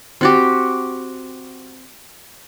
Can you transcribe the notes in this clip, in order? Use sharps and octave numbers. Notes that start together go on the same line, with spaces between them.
C4 F#4 G4